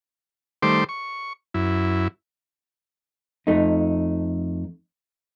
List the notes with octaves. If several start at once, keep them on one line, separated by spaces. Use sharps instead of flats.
D#3 G3 A3 C5 C6 D6
C#6
F#2 E4
F2 A3 D#4